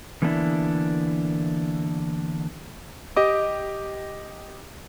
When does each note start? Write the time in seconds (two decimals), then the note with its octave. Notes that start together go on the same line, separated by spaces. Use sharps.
0.22 D3 E3 A#3 B3 D4 E4
3.16 G4 D#5 D6